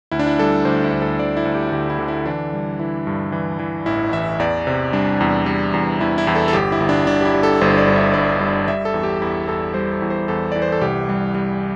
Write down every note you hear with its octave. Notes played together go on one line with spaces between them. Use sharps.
D2 E4
D4
E4
G3 A4
D2 C5
E4
D2
A4
D2 D5
E4
D2
G4
D2 G4
E4
D3
E4
E3 D4
G3
E3 E4
G2
E3
E3
A1 E4
E3 E5
E2 D5
C3
G3 D4
E2
G3
E2
E2 E4
E4
E2
A4
A4
G1 G4
E4
G1
D4
G1 D4
G4
E4
G3
A4
G1 C5
D5
G2
E5
G2 D5
G3
G3 E5
A4
E2
G4
E2 E4
E2 A4
G3 C5
A4
E2
C5
E2 A4
E3 D5
C5
A4
C2 G4
G3
G3